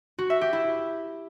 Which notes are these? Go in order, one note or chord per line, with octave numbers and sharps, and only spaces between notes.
F#4
E5
G4
E4